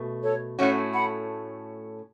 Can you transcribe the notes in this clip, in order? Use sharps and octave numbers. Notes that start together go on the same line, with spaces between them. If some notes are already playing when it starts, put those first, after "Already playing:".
Already playing: B2 A3
A4 C#5
A2 A3 C#4 F#4 C#5 F#5
F#5 B5